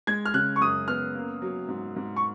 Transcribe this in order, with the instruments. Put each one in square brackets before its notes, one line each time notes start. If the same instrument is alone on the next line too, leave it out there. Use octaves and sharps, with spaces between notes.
[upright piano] G#3 [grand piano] G#6
[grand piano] F6
[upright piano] C#3 [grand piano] F#6
[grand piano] C#6
[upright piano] F#2 [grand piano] D#6
[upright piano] B3 [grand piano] F6
[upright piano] A#3
F#3
G#2
G#2
[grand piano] C#6